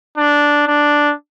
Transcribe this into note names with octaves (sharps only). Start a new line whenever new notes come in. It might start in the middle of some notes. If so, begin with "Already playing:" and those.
D4
D4